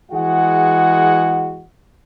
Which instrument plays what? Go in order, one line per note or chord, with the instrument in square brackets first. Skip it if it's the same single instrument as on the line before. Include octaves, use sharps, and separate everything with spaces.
[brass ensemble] E3 G#3 F#4 G#4 F#5